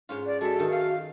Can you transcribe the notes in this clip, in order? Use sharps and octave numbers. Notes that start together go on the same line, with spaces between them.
G#2 C#4 F4
D5
G#3 F#4 A4 E5
F#2 D#3
F5